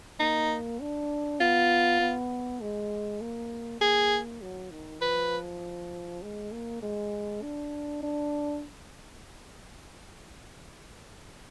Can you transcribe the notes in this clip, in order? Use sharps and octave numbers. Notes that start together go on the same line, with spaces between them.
A#3 D#4
D4
B3 F4
B3
G#3
A#3
A#3 G#4
F#3
D#3
F3 B4
G#3
A#3
G#3
D4
D4